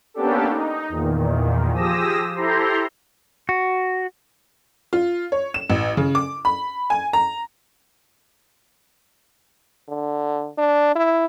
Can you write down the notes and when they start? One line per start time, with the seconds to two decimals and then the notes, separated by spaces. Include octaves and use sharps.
0.14 A#3 B3 C#4 D4 G4 A4
0.48 D#4
0.89 E2 A#2 D#3
1.72 F3 G4 G#4 D#6 E6 A#6
2.35 E4 G4 A4 C5 A#5 C6
3.49 F#4
4.93 F4
5.32 C#5
5.54 E7
5.70 A1
5.97 C#3
6.15 D6
6.45 B5
6.90 G#5
7.13 A#5
9.88 D3
10.58 D4
10.95 E4